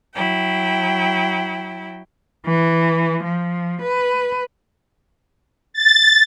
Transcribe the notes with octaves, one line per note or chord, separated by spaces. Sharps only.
F#3 E4 G5
E3
F3
B4
A6